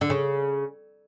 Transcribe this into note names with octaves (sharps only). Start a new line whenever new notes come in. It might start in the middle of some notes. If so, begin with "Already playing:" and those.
D3
C#3